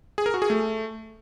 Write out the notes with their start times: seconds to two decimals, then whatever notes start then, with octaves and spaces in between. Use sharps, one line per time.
0.18 G#4
0.26 A#4
0.34 F#4
0.42 G#4
0.50 A3